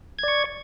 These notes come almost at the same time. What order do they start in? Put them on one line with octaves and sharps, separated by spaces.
G#6 D5 C#6